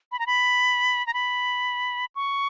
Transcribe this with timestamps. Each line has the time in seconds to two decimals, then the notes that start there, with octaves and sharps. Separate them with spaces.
0.12 B5
0.19 A#5
0.27 B5
1.07 A#5
1.14 B5
2.16 C#6